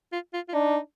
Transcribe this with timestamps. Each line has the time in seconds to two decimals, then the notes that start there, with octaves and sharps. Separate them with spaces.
0.12 F4
0.33 F4
0.49 F4
0.54 D4 D#4